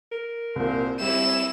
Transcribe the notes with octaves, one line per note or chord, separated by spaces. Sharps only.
A#4
C2 A#2 C5
G3 C4 E4 E7